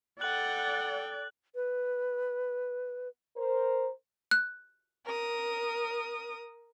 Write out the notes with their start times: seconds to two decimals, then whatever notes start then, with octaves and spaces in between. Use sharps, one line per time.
0.21 A4 D5 F#5 G5 F#6 F#7
1.55 B4
3.36 A#4 C5
4.31 F#6
5.05 A#4 D#6